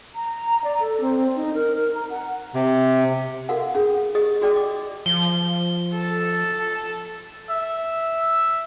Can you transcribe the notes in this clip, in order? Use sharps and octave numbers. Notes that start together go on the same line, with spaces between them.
A#5
D5
A4
C4
D#4
A#4
A#4
A#5
F#5
C3
F#4 A4 A#4 F5 F#5
C#4 G#4 F#5
G4 G#4 D#5 D#6
F#4 G#4 D5 G5 D6
D#5 D6
F3 G7
A4
E5